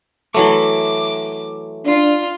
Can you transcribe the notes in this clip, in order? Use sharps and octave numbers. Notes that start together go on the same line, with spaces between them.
E3 F#3 A3 D6
D4 F4